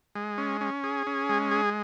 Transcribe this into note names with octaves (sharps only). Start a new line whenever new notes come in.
G#3
C#4
C#4
G#4
C#4
G#3
G#4